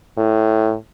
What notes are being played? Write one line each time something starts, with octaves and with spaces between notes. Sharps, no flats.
A2